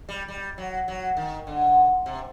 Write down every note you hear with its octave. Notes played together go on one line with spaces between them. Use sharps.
G3
G3
F#3
F#3
D#3
D3
C3